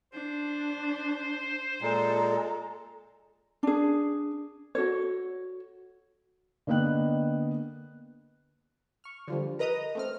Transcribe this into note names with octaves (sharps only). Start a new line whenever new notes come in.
D4 C5
A#2 G#3 A4 A#5
D4 G#4
F#4 A4 C#5
D3 A#3 B3 D#5 G5 F#6
C#6 F6
D3 F3 G3
A#4 B4 D#5 A#5 D#6
A3 C4 F6